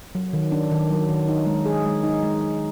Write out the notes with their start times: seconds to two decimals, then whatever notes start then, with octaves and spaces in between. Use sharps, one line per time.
0.15 F#3
0.33 D#3
0.52 D4
0.71 D#3
0.91 F#3
1.09 D#3
1.28 D#4
1.46 G#3
1.66 G#4
1.86 G#3
2.03 D#4
2.23 G#3
2.41 G#3